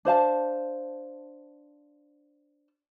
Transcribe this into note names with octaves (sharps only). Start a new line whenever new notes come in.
D4 C5 F5 A5